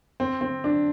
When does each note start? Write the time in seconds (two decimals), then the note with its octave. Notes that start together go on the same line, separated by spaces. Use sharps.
0.20 C4
0.41 C4
0.64 D4